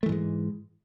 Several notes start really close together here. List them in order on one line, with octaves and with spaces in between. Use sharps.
A3 E3 G#2 G#3